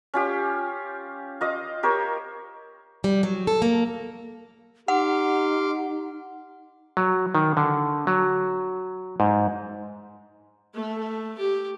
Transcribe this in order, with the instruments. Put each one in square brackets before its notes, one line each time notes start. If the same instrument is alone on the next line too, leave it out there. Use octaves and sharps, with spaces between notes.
[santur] C#4 F4 G4
F4 D#5 D6
G4 A#4 C5 C#5
[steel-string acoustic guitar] G3
F#3
A4
A#3
[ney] D#4 [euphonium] G4 [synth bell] F#5 [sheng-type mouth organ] C6 D6 F6
[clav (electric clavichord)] F#3
D#3
D3
F#3
G#2
[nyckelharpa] A3
G4